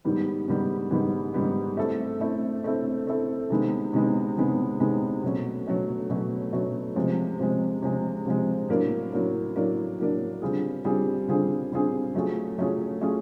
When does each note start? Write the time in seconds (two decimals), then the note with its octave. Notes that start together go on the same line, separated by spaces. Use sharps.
0.05 G#2 D#3 G3 B3
0.48 G#2 D#3 G3 B3
0.91 G#2 D#3 G3 B3
1.34 G#2 D#3 G3 B3
1.77 A3 C4 E4 A4
2.20 A3 C4 E4 A4
2.64 A3 C4 E4 A4
3.07 A3 C4 E4 A4
3.50 C3 D#3 G#3 B3
3.93 C3 D#3 G#3 B3
4.37 C3 D#3 G#3 B3
4.80 C3 D#3 G#3 B3
5.23 B2 F#3 A3 C#4
5.67 B2 F#3 A3 C#4
6.10 B2 F#3 A3 C#4
6.52 B2 F#3 A3 C#4
6.96 C3 F3 G#3
7.40 C3 F3 G#3
7.82 C3 F3 G#3
8.26 C3 F3 G#3
8.69 A2 F#3 A#3 D4
9.12 A2 F#3 A#3 D4
9.56 A2 F#3 A#3 D4
9.98 A2 F#3 A#3 D4
10.42 D3 G3 C4 F4 G#4
10.85 D3 G3 C4 F4 G#4
11.28 D3 G3 C4 F4 G#4
11.71 D3 G3 C4 F4 G#4
12.14 F#3 A3 C#4 F4 G#4
12.58 F#3 A3 C#4 F4 G#4
13.01 F#3 A3 C#4 F4 G#4